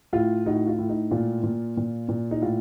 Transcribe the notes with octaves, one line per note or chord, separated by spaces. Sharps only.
A2 F4
A2 D#4 F#4
F4
A2
D#4
A#2 F4
A#2
A#2
A#2
D#4
A2 F4